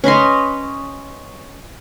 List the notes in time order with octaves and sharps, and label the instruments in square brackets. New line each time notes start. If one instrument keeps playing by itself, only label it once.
[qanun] C#4 B4 D#5 C6